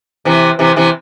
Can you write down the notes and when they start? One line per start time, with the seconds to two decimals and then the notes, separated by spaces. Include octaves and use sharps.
0.25 C3 E3
0.59 C3 E3
0.76 C3 E3